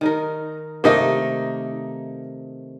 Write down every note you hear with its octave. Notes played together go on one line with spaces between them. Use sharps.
D#3 D#4 A#4
C3 D#3 A3 A#3 D#4 D#5